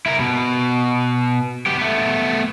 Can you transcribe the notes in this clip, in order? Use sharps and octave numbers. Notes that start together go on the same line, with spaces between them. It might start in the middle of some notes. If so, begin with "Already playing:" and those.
E4 A#4
B2
B3 G4
A3 B3